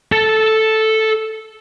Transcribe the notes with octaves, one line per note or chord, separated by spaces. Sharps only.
A4 A5